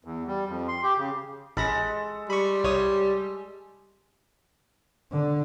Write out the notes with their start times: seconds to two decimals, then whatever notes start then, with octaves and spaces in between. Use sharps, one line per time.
0.05 E2
0.27 G3
0.49 F2
0.68 C6
0.83 G4
0.98 C#3
1.57 A1 G#3 A4 B5 A#6
2.29 G3 B5 C#6
2.64 C2 C#5 D#6
5.12 D3